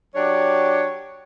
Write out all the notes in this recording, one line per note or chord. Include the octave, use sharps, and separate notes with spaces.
F#3 D4 G4 C#5